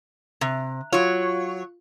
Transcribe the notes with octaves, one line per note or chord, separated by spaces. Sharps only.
C3
F#3 F4 C#5